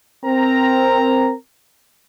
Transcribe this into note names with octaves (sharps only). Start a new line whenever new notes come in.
C4 A#4 A#5